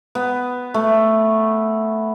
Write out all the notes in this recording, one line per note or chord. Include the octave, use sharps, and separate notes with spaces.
B3
A3